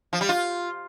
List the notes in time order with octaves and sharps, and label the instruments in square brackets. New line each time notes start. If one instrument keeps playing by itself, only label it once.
[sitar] F3
G3
F4